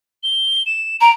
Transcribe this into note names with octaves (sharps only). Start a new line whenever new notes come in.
G7
E7
A#5 D7